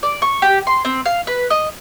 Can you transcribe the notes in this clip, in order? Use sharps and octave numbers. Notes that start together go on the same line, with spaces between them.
D5
C#6
G4
C6
C4
F5
B4
D#5